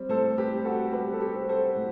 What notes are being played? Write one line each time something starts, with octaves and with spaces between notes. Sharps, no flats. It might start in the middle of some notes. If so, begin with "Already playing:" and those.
Already playing: G3 C4
A2 A4 C5
G4 B4
A2
F#4 A4
G3 G4 B4
A4
G4
C4
A4 C5
A2